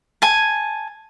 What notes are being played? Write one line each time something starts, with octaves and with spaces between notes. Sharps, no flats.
G#5 A5